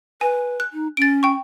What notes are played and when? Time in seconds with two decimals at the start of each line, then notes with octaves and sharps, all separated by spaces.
0.21 B4 G#5
0.60 F#6
0.73 D#4
0.97 C#4 A6 D7
1.23 G5 C#6